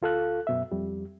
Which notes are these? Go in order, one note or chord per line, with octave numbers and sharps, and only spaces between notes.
D2 F4 A4 F5 F#6
F#2 B2 E5
F2 G3